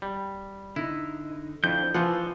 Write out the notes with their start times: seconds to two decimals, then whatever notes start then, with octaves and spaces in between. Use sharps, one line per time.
0.02 G3
0.76 D3 D#4 E4
1.64 F2 F3 D4 E4 G6
1.94 E3 F3 F4 B4 F#5